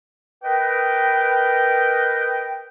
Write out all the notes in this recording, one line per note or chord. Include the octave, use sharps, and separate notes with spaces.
A#4 B4 D#5 G5